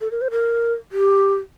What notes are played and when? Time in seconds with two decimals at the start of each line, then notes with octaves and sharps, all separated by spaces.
0.01 A4
0.11 A#4
0.21 C5
0.31 A#4
0.92 G4